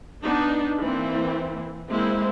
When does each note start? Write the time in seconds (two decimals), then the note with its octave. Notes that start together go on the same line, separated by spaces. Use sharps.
0.23 B3 D4 D#4
0.79 E3 A#3 C4 E4
1.89 G#3 A#3 C4 E4